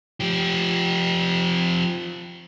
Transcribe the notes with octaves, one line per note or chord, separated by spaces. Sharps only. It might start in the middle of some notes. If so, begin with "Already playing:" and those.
F3 G4